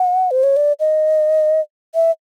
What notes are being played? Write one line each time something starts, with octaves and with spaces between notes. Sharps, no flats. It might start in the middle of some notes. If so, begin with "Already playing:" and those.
Already playing: F#5
C5
C#5
D5
D#5
E5